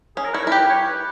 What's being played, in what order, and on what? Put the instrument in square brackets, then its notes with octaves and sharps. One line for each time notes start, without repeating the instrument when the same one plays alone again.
[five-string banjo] C#4 [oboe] G#4
[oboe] A#4
[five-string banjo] E4 [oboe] C#5
[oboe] A#4
[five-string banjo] E4
[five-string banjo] G4 [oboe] B4
[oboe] C#5
B4